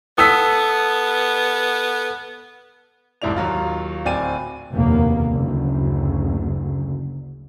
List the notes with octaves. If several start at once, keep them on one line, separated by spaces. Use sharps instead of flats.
B3 A4 D#6 E6 B6
C2 F2 G#2 E4 D5 F7
D#2 F#3 F4 F5
D1 C4 D5 G5 G#5 D#7
F1 A#1 D#2 A#3 B3
F#1 D2